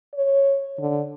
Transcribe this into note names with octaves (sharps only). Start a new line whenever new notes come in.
C#5
D3